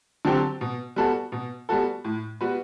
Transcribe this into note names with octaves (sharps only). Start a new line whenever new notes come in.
D3 F#3 C4 G4
B2
G3 B3 F#4 A4
B2
G3 B3 F#4 A4
A2
G3 B3 F#4 B4